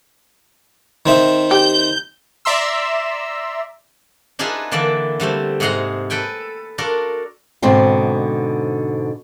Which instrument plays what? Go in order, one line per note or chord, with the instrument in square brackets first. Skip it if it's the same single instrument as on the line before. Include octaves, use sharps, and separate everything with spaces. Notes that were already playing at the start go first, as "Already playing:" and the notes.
[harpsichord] D#3 C4 E5
[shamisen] G4 [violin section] G6
[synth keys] D5 E5 A#5 C6 E6
[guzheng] D4 D#4 F4 G#4 B4 E5
D3 E3 A#3 D5 E5 A5
D3 G3 A3 C4
G#2 C3 G#4 F#5 A#5 C6
A4 B4 G5 G#5
D4 F4 F#4 A4 A#4
[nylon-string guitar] G#2 B2 D3 C4 D4